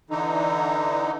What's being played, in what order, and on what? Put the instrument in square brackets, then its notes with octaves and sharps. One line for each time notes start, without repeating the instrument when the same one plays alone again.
[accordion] D3 E3 D#4